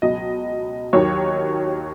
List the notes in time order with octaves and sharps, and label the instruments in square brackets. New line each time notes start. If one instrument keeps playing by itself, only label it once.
[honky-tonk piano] C#2 B2 F#3 D#5
D#2 D#3 F#3 C#5